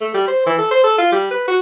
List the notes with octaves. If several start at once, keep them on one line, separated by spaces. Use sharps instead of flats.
A3
G3
C5
E3
A4
C5
A4
F4
G3
B4
F#4